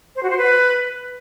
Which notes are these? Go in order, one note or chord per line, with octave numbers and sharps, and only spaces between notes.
C5
F#4
C5
B4